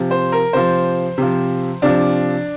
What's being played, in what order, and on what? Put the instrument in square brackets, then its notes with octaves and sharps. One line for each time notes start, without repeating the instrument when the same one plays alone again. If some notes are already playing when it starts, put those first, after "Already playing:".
Already playing: [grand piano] C3 F3
C5
A#4
C3 F3 C5
C3 F3
C3 F3 D4